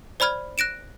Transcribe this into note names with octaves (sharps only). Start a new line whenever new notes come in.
C5 D5 B5 F6 G#6
F#6 A#6 D7 E7